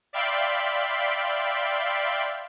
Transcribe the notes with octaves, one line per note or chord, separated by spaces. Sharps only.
D5 E5 F5 G5 B5 C6